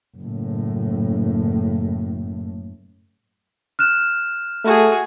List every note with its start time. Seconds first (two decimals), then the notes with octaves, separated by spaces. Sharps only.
0.18 F#1 A2
3.79 F6 F#6 E7
4.64 A3 F#4 G#4